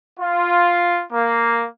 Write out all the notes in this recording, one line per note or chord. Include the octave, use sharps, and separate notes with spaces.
F4
A#3